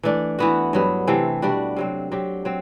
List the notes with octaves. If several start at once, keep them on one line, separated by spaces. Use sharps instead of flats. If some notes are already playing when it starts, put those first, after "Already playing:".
E3 A3 D4
E3 B3 F#4
G2 F#3 B3
C3 E3 A3 C4
B2 G3 D4 F#4
C3 F#3 C4
F#3 C4 G4
F#3 C4